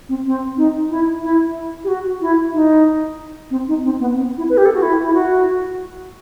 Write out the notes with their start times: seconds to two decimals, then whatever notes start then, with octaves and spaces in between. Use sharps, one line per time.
0.09 C4
0.26 C4
0.57 D#4
0.90 E4
1.23 E4
1.84 G4
1.88 F#4
2.21 E4
2.53 D#4
3.51 C4
3.68 D#4
3.84 C4
4.00 B3
4.17 C4
4.38 E4
4.50 B4
4.57 G4
4.66 A4
4.74 F#4
4.82 E4
5.03 E4
5.14 F#4